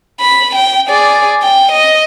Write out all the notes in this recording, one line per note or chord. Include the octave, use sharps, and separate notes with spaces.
B5
G5
G#4 D5
G5
D#5